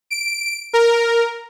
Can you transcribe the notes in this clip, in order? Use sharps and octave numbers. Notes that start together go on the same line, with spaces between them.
D7
A#4